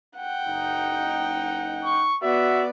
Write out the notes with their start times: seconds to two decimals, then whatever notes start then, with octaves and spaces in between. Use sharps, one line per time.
0.18 F#5 G5
0.47 F#1 D#4
1.85 C#6
2.23 B3 F#4 D5 E5